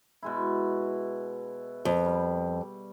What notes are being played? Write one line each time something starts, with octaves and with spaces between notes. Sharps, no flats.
B2 G#3 E4
F2
G3